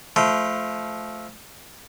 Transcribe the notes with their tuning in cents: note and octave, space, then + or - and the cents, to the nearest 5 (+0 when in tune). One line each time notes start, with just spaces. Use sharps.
F3 -10 A3 -20 C6 -35